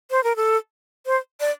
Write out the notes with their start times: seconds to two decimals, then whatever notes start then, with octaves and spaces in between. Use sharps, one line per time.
0.11 C5
0.24 A#4
0.36 A4
1.06 C5
1.40 D5